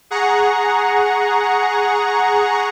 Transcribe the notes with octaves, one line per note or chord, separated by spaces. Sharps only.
G#4 F#5 A#5 C#6